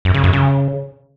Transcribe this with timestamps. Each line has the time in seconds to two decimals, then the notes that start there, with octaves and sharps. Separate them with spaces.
0.05 F#2
0.14 C#3
0.24 F#2
0.33 C#3